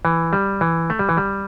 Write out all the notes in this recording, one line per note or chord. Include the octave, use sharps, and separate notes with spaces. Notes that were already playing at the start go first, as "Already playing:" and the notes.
E3
G3
E3
A3
G3
E3
G3